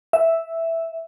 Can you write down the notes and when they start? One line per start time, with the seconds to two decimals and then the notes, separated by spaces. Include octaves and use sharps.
0.13 E5